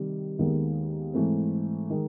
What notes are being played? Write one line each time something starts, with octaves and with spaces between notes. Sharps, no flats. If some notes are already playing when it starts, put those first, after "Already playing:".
Already playing: C3 D#3 G3
D#2 D#3 G#3 B3
G#2 E3 A3 C4
D#3 G#3